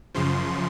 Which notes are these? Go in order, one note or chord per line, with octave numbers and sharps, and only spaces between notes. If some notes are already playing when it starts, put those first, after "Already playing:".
F#2 C#3 F3 C6